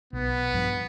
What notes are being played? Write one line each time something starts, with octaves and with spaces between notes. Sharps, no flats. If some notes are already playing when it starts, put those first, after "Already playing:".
B1 B3
G2 F3